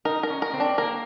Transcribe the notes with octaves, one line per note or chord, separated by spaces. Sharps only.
D#4 A#4
A#4
C#4
A#4
C4
D4
A#3 A#4